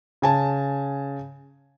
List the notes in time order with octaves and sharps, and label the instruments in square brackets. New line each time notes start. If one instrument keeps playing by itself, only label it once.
[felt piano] C#3 G#5 A5